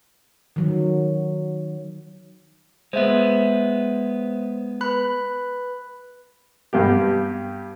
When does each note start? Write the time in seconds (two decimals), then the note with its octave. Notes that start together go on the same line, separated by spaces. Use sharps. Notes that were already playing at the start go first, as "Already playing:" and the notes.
0.56 D#3 F#3
2.93 G#3 B3 C5 E5
4.81 B4 B5 F#6
6.73 G2 B3 G4